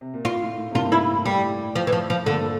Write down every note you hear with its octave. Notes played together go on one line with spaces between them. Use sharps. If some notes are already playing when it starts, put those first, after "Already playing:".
C3
A#2
A2 F4
A2
A2
C3
G2 A#2 F4
E4
A2
A2 G3
F3
E3
F3
F3
G2 A#2 D3